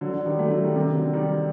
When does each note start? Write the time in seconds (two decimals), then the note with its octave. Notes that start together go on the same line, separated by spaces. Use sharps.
0.01 D3 F#3
0.13 D3 F#3
0.26 D#3 G3
0.39 F#3 A3
0.51 F#3 A3
0.63 D#3 G3
0.76 C3 D#3
0.94 D3 F#3
1.13 D#3 G3